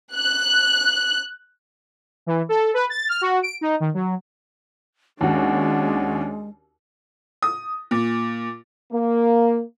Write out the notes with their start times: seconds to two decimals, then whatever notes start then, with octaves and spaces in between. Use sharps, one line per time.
0.14 F#6
2.26 E3
2.49 A4
2.74 B4
2.90 A6
3.09 F6
3.21 F#4
3.42 D7
3.61 D#4
3.80 D#3
3.94 F#3
5.21 D#2 G#3 C#4 D4 F#4
7.42 D#6
7.91 A#2
8.92 A#3